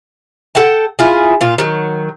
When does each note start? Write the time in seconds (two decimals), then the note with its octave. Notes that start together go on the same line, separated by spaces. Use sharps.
0.55 A4 F#5 G5 A5
0.99 E4 F4 G#4
1.41 A#2 F4
1.58 D#3 F#3